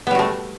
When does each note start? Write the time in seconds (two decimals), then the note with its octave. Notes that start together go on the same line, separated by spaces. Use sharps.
0.07 B3
0.11 G3
0.15 F#4
0.19 A3